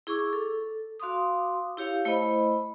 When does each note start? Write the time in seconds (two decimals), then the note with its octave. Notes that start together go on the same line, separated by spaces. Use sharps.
0.07 E4 G#4 C#6 D6 E6
0.33 A4
1.00 F#4 F5 C6 D6 D#6
1.77 E4 G4 C#5 F5
2.05 A3 E4 C5 D#5 B5